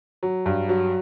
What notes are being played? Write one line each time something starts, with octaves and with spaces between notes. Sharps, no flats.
F#3
G2
F#3